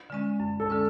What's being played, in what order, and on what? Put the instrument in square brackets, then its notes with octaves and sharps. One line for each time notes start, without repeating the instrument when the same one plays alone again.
[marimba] D3 G#3 C#4
F#2
[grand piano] A4
[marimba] D3 G#3 C#4